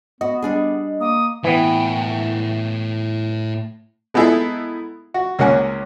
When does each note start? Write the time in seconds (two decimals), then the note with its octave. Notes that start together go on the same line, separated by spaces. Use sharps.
0.21 B3 F#4 D#5
0.42 G3 D4 G#4
1.00 A#3 D#6
1.44 A2 E3 B3 G5
4.14 G#3 B3 D#4 E4 G#4 A4
5.14 F#4
5.39 C#2 A#3 C#4 F#5 G#5